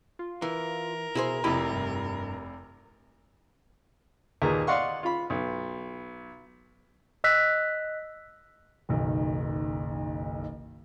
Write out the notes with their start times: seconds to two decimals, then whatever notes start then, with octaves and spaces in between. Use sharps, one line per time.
0.19 F4
0.42 E3 A#4
1.15 B2 E4 G#4 C5
1.44 F1 F2 C3 E4 G4 D#5 B5
1.72 G2
4.42 D#2 A#2 A#3 G#4 B4 A#5
4.67 D5 D#5 F5 F#5 C6 C#6
5.03 F4 B5
5.30 B1
7.24 D#5 E6 F#6 B6
8.89 F#1 B1 D#3